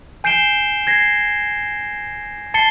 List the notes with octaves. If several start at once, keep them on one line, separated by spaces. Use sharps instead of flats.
G#5 G6 C7 D7 E7 G7
G#6 A#6 C7
A5 A6 C7 C#7 G7